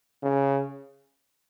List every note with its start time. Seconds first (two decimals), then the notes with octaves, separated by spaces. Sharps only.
0.23 C#3